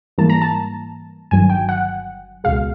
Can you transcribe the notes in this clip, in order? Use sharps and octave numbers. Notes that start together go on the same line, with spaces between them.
G#2 E3 G3 A#3 A5
A#5
A5
G1 G2 D#3 F#3 G#5
G5
F#5
C#2 B2 G#3 F5